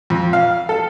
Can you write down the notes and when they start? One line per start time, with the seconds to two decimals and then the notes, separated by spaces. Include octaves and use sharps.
0.10 F2
0.33 F5
0.69 A4